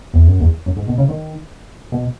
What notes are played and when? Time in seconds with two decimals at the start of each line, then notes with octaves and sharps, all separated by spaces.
0.14 E2
0.27 F#2
0.40 E2
0.66 F#2
0.77 G#2
0.87 B2
0.98 C#3
1.09 D#3
1.92 B2